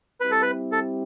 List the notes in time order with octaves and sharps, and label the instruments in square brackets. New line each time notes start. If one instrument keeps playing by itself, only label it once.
[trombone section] G3 C4 E4 G4 [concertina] B4
[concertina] A4
B4
A4